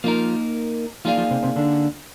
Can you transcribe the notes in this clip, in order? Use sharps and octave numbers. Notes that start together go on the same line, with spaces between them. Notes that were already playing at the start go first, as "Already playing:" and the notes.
F3 A#3 D#4 F4 A#4
F3 A#3 D#4 F4 G#4 D5 F5
F3 F4
C3 C4
C3 C4
D3 D4